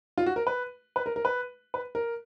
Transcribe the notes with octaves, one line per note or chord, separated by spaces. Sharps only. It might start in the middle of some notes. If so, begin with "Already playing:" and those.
F4
F#4
A#4
B4
B4
A#4
A#4
B4
B4
A#4